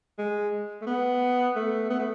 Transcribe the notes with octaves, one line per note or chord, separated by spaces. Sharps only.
G#3
A3
B3
A3
B3
A3